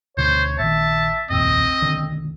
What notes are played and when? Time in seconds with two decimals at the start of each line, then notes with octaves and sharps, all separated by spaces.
0.18 D2 B2 D3 C5 C#5
0.59 A#1 D#3 E5 A5
1.30 F1 A#1 D#2 C4 D#5
1.82 B1 D3 D#3